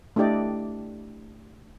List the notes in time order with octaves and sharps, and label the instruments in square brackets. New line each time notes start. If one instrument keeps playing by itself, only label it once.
[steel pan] A3 D4 E4 G4 D5 D#5